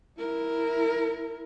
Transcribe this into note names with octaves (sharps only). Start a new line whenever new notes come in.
E4 A#4